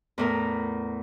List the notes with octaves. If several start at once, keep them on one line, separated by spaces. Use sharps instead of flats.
E2 A2 A#4